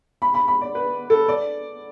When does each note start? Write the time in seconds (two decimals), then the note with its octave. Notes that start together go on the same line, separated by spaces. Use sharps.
0.22 B5
0.34 B5
0.48 B5
0.61 D5
0.75 B4
1.10 A4
1.28 D5